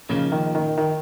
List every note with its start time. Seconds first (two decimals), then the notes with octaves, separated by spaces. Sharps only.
0.09 A#2 C#3 F3 A#3 D#4
0.32 D#3
0.55 D#3
0.78 D#3